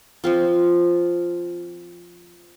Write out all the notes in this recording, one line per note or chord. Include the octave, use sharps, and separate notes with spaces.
F3 C4 F4